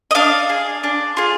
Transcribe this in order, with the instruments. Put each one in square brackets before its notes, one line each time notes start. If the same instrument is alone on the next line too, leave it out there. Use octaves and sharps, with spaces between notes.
[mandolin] D#5
D4 F5
G#4
D4
F4 G#4